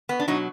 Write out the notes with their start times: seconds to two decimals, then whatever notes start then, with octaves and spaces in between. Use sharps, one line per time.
0.09 B3
0.20 D4
0.28 B2 F#3 D#4